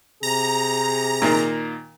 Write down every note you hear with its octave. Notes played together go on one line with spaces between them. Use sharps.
C3 G#4 A#5
A#2 D#3 A#3